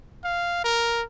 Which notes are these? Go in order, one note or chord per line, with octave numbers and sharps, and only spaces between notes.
F5
A#4